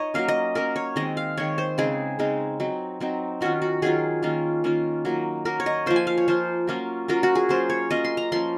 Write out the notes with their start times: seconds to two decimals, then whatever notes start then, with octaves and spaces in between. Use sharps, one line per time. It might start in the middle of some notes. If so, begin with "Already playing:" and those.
Already playing: D#4 C#5 D#5
0.14 F#3 A#3 C#4 F5
0.28 D#5
0.55 F#3 A#3 C#4 A#4
0.76 C#5
0.96 D#3 G#3 C4 D#5
1.17 F5
1.37 D#3 G#3 C4 C#5
1.58 C5
1.78 C#3 G#3 C4 D#4 G#4
2.19 C#3 G#3 C4 D#4
2.60 F#3 C4 D#4
3.00 F#3 C4 D#4
3.41 D#3 F#3 C#4 F4 F#4
3.62 F#4
3.82 D#3 F#3 C#4 F4 G#4
4.23 D#3 A#3 C#4 F4
4.64 D#3 A#3 C#4 F4
5.05 F#3 A#3 D#4
5.45 F#3 A#3 D#4 A#4
5.60 C#5
5.66 D#5
5.86 F3 A#3 F4 C5
5.96 G#5
6.07 F5
6.18 C#5
6.28 F3 A#3 F4 C5
6.67 F#3 A#3 C#4 F4
7.08 F#3 A#3 C#4 F4 A#4
7.23 F#4
7.35 G#4
7.49 F#3 A#3 C#4 F4 C5
7.70 C#5
7.91 F#3 A#3 C#4 F4 D#5
8.05 C6
8.17 A#5
8.32 F3 A#3 C#4 C6